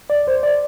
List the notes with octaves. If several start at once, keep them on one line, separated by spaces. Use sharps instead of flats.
D2 D5
D2 C5
D5